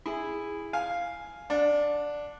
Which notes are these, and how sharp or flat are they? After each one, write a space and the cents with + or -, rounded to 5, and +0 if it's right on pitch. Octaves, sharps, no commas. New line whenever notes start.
E4 +0 G#4 -10
F5 +0 G#5 +5
D4 +0 F#5 -45